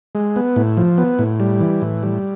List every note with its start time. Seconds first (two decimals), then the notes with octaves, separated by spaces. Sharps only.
0.15 G#3
0.36 B3
0.56 A2
0.77 F3
0.98 B3
1.19 A2
1.40 G3
1.60 E3
1.82 A2
2.03 G3